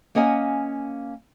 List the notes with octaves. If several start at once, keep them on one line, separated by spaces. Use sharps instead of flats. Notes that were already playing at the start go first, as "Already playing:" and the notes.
A#3 C#4 D#5 F#5 G#5